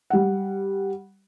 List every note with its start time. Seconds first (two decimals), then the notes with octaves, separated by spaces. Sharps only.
0.10 G3 F#5